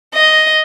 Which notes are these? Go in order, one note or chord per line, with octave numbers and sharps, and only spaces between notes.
D#5